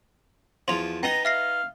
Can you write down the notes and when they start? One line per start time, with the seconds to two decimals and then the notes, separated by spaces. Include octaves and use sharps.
0.68 E2 F3 C6 F7
1.03 B3 D#4 G5 A#5
1.25 E5 F5 A#6 C7